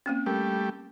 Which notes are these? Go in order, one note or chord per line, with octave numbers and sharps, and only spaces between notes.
A#3 C4 C#4
G3 A3 G4 A#4